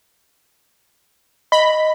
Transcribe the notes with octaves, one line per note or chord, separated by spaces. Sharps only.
D#5 B5